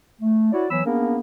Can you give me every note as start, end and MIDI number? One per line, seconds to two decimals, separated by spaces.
0.21 0.51 57
0.53 0.65 64
0.53 0.65 66
0.53 0.65 73
0.53 0.65 74
0.70 0.80 52
0.70 0.80 54
0.70 0.80 59
0.70 0.80 73
0.70 0.80 83
0.70 0.80 88
0.85 1.17 58
0.85 1.17 59
0.85 1.17 61
0.85 1.17 62
0.85 1.17 68
0.85 1.17 70